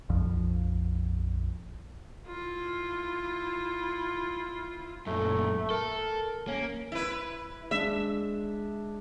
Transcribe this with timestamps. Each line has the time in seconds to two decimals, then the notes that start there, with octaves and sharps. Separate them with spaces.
0.09 A#1 F2 F3
2.28 E4 F4
5.07 F#2 A#2 A3
5.70 A4 A#4
6.48 A#3 C#4
6.92 E4 B4
7.71 G#3 D4 E5